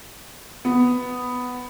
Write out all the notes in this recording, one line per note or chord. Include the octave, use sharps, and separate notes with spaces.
B3